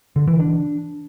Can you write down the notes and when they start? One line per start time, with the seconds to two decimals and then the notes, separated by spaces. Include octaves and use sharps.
0.16 D3
0.27 E3
0.39 D4